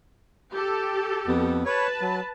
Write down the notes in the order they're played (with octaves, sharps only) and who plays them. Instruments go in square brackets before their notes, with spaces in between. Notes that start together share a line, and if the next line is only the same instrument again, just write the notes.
[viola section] G4 A4
[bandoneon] F2 B3
[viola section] B4 A5 [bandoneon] C#5
[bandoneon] F#3